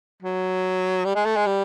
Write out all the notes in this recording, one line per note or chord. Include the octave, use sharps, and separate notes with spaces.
F#3
G3
G#3
A3
G#3
G3